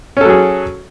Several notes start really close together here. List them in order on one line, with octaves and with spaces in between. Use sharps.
C#4 A4 F#3 G#4